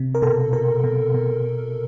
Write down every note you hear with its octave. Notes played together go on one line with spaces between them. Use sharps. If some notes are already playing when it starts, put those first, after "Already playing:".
Already playing: C3
A#4
B2 A4
B2 A#4
B2
B2